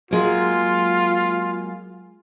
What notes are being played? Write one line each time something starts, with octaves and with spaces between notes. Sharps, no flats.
F#3 G#3 A#3 F4